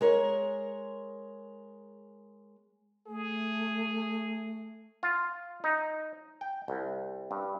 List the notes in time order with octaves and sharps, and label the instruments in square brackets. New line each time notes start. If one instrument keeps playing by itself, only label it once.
[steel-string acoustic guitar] G#3 A#4 C#5
[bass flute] A3 [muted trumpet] G#4
[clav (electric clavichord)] F4
D#4
G5
C2
G2